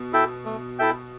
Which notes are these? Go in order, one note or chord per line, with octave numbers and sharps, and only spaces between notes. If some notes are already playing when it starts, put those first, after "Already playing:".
Already playing: B2
E4 A4 E5 G5
A3
E4 A4 E5 G5